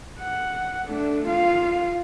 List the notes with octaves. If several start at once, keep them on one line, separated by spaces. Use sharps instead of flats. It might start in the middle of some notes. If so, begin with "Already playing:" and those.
F#5
A3 D4
F4 F5